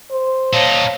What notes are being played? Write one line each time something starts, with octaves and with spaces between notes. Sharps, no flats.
C5
A#2 D#4 C#5 F5 A5